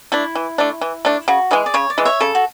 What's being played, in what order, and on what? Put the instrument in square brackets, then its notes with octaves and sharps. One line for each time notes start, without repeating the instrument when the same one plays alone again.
[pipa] A3 D4 [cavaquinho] E4
[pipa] E3
A3 D4
E3
A3 D4
[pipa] C#3 [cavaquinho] F#4
[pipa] E3 G#3 [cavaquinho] G#4
[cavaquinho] D5
[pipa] C#3 [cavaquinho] C#5
[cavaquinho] D5
[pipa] E3 G#3
[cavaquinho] C#5 E5
[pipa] C#3 [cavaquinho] A4
[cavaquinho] F#4